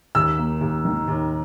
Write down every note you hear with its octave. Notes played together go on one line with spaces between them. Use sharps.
D#2 E6
A#3
D#2
D#3
D#2